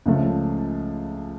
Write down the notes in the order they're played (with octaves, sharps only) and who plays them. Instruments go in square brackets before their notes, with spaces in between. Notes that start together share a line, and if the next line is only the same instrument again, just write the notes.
[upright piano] C#2 C#3 F3 A3